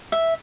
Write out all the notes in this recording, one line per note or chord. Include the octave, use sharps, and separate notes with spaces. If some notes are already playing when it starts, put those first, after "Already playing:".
E5